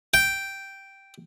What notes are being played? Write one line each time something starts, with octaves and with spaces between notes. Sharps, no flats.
G5